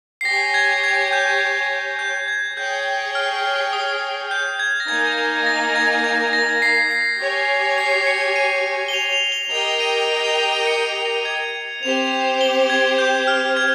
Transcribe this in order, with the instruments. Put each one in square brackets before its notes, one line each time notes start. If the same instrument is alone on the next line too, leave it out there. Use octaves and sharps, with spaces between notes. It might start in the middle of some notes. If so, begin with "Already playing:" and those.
[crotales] C7
[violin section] G4 C#5 G#5 [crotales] A#6
[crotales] G#6
G#6
G6
G6
G#6
[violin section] G#4 C#5 G5 [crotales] G6
[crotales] F6
D#6
G6
G#6
A#6
[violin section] A#3 D#4 A#4 F5 G#5 [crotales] G#6
[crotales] A#6
G#6
G#6
A#6
C7
C7
[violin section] G4 C#5 G#5
[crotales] C7
C#7
D#7
G7
F7
F7
G7
[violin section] G4 A#4 D#5 G5 [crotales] F7
[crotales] D#7
F7
F7
D#7
D#7
C#7
G#6
[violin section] C4 G4 C5 [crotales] F7
[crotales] G7
G#6
G6
F6
G#6